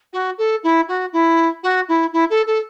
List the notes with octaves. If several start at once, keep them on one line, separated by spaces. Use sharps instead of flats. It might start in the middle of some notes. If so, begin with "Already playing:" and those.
F#4
A4
E4
F#4
E4
F#4
E4
E4
A4
A4